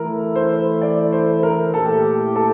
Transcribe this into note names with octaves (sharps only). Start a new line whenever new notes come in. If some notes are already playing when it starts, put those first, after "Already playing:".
Already playing: E3 A3 E4 A#4
C5
D5
C5
A#4
A#2 A3 E4 G4 A4
A4